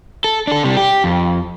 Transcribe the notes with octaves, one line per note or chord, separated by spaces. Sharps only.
A4
D4 A4
C3 G3
G4
F2